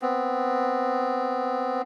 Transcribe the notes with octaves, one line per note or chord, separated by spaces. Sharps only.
B3 C4